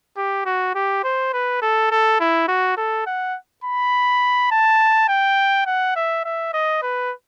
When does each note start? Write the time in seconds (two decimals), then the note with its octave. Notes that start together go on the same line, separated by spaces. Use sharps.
0.17 G4
0.45 F#4
0.75 G4
1.04 C5
1.33 B4
1.62 A4
1.91 A4
2.20 E4
2.48 F#4
2.77 A4
3.06 F#5
3.64 B5
4.51 A5
5.09 G5
5.66 F#5
5.96 E5
6.24 E5
6.53 D#5
6.82 B4